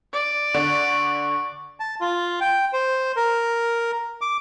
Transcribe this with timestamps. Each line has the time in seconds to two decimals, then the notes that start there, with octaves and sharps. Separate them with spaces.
0.13 D5
0.54 D3 C#6
1.80 A5
2.01 F4
2.41 G5
2.73 C5
3.16 A#4
4.21 D6